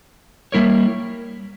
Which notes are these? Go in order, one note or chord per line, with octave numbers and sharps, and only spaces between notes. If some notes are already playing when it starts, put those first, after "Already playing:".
G3 A#3 E4 A#4 C#5